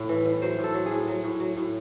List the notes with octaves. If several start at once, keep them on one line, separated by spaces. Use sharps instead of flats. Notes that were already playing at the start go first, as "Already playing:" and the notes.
Already playing: A2
E3
A2
F#3 C5
A2
A4
F#3
G#4
A2
F#3
A2
F#3
A2